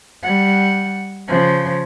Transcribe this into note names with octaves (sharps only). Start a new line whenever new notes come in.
G3 F#5
C#3 F3